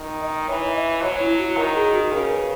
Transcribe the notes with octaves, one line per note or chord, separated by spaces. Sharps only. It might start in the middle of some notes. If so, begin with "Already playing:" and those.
Already playing: D#3
D#5
E3 C#5
E5
D#5
D#5
F#3 C#5
E4
F#4
D#3 A#4
G#4
F#4
C#3 A#4
B4